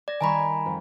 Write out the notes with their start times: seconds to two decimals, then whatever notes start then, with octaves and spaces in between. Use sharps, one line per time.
0.08 D5 A6 A#6
0.21 D#3 G3 G#5 A#5 B5 C#6
0.66 F2